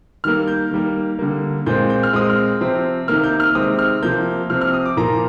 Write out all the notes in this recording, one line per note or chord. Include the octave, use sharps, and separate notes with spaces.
D#3 G3 A#3 F6
G6
D#3 G3 A#3
D3 G3 A#3
A#2 G#3 C4 G6
G6
F6
A#2 G#3 C4 D#6
F6
C3 F3 C4
C3 D#3 A#3 F6
G6
F6
C3 D#3 G#3 C4 D#6
F6
C3 F3 A#3 G6
C3 F3 C4 F6
F6
D#6
D6
A#2 F3 A#3 A#5